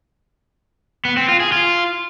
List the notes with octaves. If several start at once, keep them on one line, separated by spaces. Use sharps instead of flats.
B3
C4
F4
G#4
F4